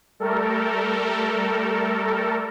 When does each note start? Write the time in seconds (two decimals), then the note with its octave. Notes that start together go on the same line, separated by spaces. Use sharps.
0.20 G3 A3 A4 A#4